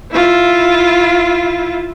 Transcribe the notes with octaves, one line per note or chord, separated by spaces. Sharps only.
E4 F4